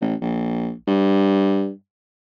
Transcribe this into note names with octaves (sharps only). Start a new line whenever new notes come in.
A1
A#1
G2